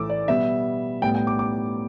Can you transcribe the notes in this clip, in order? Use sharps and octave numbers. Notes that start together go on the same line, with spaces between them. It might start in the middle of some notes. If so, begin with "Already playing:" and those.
Already playing: A2 E3 A3 D6 E6
D5
B2 G3 B3 E5
A2 G3 B3 G5
G5
D6
D6